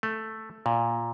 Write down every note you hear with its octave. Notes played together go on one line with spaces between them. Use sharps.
A3
A#2